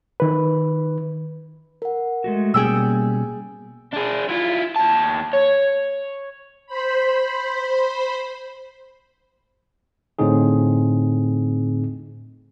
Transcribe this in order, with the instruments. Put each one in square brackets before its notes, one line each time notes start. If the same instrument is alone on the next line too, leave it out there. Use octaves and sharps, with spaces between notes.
[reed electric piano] D#3 B4
[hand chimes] A#4 F#5
[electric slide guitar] G#3 A3 F#4
[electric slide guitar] B2 G3 C#4 [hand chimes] A#3 [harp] G#4 G5 E6
[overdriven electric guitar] D4 G#4
E4 F4
D#2 A5
C#5
[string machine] C5 B5
[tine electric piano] A2 D3 C4 D#4 G#4